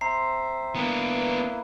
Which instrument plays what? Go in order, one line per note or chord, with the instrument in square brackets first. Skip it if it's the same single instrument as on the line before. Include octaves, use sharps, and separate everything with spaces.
[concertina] C4 C5 E5 [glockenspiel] A#5 C7
[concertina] A#3 E4 B4 [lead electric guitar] B3 D4